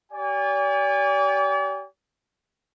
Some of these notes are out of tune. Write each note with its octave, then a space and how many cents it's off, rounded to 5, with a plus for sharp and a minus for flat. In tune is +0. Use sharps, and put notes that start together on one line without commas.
G4 -30 D5 -40 G#5 -40